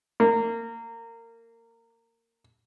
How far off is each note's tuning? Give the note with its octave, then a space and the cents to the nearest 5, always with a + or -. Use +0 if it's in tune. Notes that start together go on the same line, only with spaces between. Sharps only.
A#3 -20